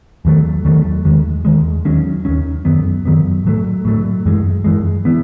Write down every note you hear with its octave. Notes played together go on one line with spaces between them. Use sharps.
E2 D#3 F#3 A3
E2 D#3 F#3 A3
E2 D#3 G#3
E2 D#3 G#3
D#2 D#3 F#3 C#4
D#2 D#3 F#3 C#4
F#2 D#3 F#3 B3
F#2 D#3 F#3 B3
A2 F#3 A3
A2 F#3 A3
F#2 E3 G#3
F#2 E3 G#3
E3 B3